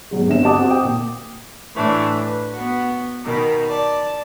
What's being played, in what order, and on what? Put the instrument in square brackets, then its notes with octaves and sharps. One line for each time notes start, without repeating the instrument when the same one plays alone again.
[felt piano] G#2 B2 F#3 G#3
G1 G2 C4 E5 E7
F#4 G4 D#5 A5 D6 D#6
C4 F#4 G4 C5
G5 D#6
A#2
[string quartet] A2 E3 A3 D4
B4
B3 F#4
B2 D#3 B5
D5 A5